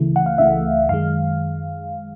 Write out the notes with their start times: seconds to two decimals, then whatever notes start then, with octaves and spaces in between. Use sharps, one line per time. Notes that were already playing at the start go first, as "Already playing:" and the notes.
Already playing: C#2 C#3 E3 A3
0.16 F#5
0.26 F5
0.38 C#2 C#3 E3 A3 E5
0.89 F#2 D#3 G#3 F5